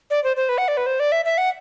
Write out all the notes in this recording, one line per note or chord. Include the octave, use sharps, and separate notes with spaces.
D5
C5
C5
B4
F#5
D5
B4
C5
D5
E5
E5
F#5